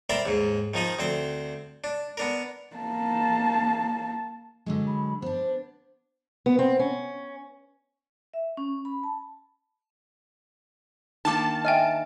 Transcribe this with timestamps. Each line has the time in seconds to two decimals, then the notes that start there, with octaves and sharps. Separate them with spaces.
0.09 A#4 C5 D5 E5 G5 B5
0.25 D#2 G#2
0.74 D#3 F3 D#4 D#5
0.99 D2 C4 C5
1.84 D4
2.17 B3 D4 A#4
2.76 A#3 A5
4.66 D3 F#3 G#3
4.87 B5
5.22 B3 D4 C5
6.46 B3
6.59 C4
6.79 C#4
8.34 E5
8.57 C#4
8.85 B5
9.03 A5
11.25 D#3 A#3 D4 A5 D6
11.65 D#5 E5 G5 G#5 F6